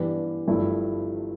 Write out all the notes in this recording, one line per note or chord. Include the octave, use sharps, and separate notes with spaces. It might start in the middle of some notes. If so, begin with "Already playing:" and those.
Already playing: G2 E3 B3 D4 G4
G1 G2 F3 A3 E4